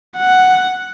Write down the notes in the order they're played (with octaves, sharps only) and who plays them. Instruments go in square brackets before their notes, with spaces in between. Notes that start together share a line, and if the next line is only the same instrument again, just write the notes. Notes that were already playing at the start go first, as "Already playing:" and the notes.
[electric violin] F#5